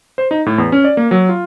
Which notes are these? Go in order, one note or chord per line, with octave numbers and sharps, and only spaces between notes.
C5
D#4
A2
E2
C#4
D5
A#3
F#3
F4